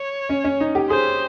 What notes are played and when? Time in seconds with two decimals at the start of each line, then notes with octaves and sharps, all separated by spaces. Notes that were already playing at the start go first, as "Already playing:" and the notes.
Already playing: C#5
0.29 C#4
0.44 C#4
0.60 D#4
0.75 G4
0.90 G#4 C5